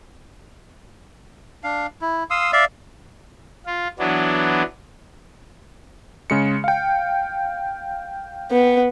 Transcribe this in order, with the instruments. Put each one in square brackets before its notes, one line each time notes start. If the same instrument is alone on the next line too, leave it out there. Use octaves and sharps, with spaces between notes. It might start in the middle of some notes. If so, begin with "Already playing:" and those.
[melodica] D4 F5
E4
F5 C6 D#6 E6
D5 E5 F5
[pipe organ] F4
E3 F#3 B3 D4
[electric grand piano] C#3 G#3 C#7
F5 G5
[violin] B3